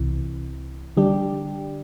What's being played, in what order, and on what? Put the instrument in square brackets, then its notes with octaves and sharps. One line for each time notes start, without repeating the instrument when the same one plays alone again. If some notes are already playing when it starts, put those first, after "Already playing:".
Already playing: [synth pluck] C2 C3 E3
D3 G3 D4 G4